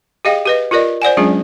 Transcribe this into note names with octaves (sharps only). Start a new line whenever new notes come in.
G4 G#4 D#5 F5 G5
G4 B4 D#5
F4 G4 A#4 D5 D#5
C5 D5 F#5 G#5
F#3 G#3 C#4 D4 F4 G#4